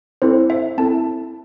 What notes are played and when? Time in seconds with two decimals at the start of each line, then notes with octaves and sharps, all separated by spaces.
0.22 C4 E4 A4 C5
0.50 E5
0.78 C4 E4 A4 A5